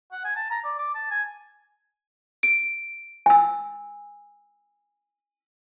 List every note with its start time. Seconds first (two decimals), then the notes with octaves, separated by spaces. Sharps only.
0.12 F#5
0.25 G#5
0.37 A5
0.51 A#5
0.65 D5
0.79 D6
0.95 A5
1.11 G#5
2.43 D7
3.26 G#5 E6